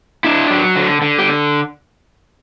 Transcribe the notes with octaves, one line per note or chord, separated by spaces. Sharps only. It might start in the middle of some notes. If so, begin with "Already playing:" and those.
D4 E4
F#3
D3
D3
G4